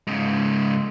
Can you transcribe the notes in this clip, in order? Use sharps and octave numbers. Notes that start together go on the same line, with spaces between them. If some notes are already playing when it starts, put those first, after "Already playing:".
G#2 C#3